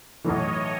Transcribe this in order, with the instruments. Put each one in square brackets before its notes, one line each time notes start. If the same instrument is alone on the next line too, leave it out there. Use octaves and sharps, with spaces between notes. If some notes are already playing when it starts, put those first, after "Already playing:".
[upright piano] B1 A2 E3 [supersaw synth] C#5 D#5